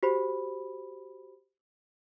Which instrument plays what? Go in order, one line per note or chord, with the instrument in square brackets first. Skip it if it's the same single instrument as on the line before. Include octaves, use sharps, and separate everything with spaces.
[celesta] F#4 G4 C5 B5